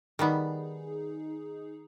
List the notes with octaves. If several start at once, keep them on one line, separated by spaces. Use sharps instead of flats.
D#3 G3 B3 D#4 G#4